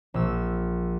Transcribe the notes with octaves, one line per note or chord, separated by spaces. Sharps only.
A#1 E6